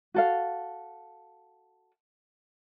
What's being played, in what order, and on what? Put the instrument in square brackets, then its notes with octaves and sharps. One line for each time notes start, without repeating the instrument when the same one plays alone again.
[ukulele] F#4 A4 F5